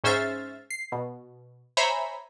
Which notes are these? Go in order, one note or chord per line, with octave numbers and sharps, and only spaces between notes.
G#2 C#4 C5 E5 F6 A6
C7
B2
C5 C#5 E5 G#5 A#5 B5